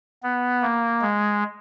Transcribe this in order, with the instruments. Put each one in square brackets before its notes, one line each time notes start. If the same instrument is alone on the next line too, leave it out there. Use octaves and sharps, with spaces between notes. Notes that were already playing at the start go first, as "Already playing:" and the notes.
[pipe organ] B3
A#3
G#3